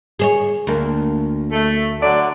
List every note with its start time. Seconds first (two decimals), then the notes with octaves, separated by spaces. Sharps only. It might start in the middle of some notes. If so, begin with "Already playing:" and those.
0.19 G#4 C5 C#5
0.67 D2 A#3
1.52 A3
2.01 D3 F#3 D5